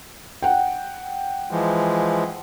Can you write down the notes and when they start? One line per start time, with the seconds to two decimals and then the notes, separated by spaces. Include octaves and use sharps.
0.42 F#5 G5
1.51 E3 F3 G#3